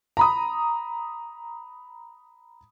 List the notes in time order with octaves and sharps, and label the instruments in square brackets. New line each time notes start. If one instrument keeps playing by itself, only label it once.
[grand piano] A#5 B5 D#6